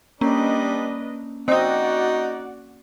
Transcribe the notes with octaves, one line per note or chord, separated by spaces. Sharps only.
G3 A#3 C#4 D4 B4 D#5
C4 D#4 F#4 D5 D#5 F#5